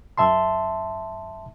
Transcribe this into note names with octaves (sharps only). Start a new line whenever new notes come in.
F#2 E5 A5 C6